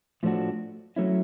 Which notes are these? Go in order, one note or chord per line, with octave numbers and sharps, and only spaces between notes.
A2 F3 A3 D4 F#4
F#3 A3 C#4 E4